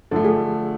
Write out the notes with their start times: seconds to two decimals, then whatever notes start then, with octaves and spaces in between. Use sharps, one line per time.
0.11 D3 F3 A3 A4
0.24 G#4